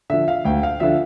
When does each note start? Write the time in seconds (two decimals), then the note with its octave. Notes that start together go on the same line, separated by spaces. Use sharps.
0.10 D3 F3 E5
0.28 F5
0.45 D2 G5
0.63 F5
0.80 D3 F3 E5